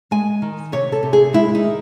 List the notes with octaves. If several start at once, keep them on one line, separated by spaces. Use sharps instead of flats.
G#3 G#5
D#3
C3 C#5
A4
C3
G#4
G#3 E4
D#4
D#3